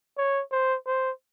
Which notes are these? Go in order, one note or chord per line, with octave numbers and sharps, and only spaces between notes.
C#5
C5
C5